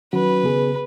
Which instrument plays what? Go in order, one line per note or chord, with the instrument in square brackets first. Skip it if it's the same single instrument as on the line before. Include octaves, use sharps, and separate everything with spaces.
[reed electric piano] D#3 F#3 C#4 F#4 [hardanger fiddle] B4
[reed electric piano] C#3 B3 G#4